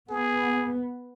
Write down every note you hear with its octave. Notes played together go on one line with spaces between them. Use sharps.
B3 G#4